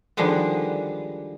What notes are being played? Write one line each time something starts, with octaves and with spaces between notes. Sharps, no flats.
D3 D#3 F3 G3 G#3 B3